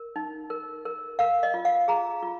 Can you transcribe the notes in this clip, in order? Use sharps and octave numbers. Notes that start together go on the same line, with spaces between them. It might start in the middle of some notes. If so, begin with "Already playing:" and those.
Already playing: A#4
D#4
A#4
A#4
A#4 F5
D#5
F4
F5
G#4 A#5
F4